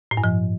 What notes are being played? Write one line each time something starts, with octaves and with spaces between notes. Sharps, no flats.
A2
G2
F3